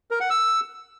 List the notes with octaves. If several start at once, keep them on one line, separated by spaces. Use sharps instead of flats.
A#4
F#5
E6